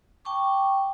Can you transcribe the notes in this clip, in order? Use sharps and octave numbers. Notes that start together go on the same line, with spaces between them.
G5 A5 C#6 D6